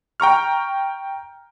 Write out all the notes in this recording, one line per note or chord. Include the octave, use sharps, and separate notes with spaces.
G5 A#5 C#6 F6